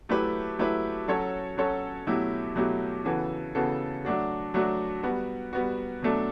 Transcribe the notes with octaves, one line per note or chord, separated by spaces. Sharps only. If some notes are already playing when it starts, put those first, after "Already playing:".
F#3 A3 E4 G4 B4
F#3 A3 E4 G4 B4
F#3 C#4 F#4 A4 C#5
F#3 C#4 F#4 A4 C#5
B2 F#3 A3 E4 G4
B2 F#3 A3 E4 G4
C#3 E3 B3 F#4 A4
C#3 E3 B3 F#4 A4
F#3 A3 D4 F#4
F#3 A3 D4 F#4
G3 B3 F#4
G3 B3 F#4
B2 F#3 A3 D4 A4